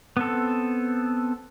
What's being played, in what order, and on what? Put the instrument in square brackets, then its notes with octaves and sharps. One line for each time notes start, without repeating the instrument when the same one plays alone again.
[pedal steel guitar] B3 C4 A4